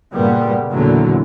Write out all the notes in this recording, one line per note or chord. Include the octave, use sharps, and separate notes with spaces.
G2 A#2 C#3 G3 A#3 B3
E2 A#2 D3 E3 F#3